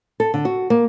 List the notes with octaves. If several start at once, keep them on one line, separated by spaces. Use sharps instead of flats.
A4
D3
F#4
A#3